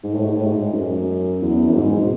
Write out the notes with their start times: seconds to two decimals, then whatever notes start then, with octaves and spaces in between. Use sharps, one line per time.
0.04 G#2
0.14 A2
0.25 G#2
0.36 A2
0.47 G#2
0.72 F#2
1.42 E2
1.68 F#2
1.75 G#2
2.00 B2